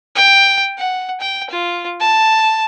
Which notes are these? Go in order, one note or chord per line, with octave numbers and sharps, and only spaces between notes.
G5
F#5
G5
F4
A5